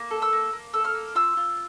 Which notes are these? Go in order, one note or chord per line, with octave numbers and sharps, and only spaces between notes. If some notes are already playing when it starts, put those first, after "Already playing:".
Already playing: A#3
A4
E6
A#3
A#3
A4 E6
F6
A#3
F4 E6
F4